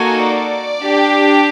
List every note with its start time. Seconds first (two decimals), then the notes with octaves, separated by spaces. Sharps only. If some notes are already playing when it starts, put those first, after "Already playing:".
Already playing: A#3 D#4 F#4 A4 G#5
0.25 D5
0.84 D4 G4